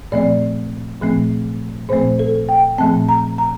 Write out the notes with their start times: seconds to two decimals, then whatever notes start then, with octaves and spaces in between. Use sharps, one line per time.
0.12 A#2 F3 A3 C4 D5
1.02 A#2 F3 A3 C4
1.89 A#2 F3 A3 C4 C5
2.19 A4
2.49 G5
2.78 A#2 F3 A3 C4 A5
3.09 A#5
3.38 A#5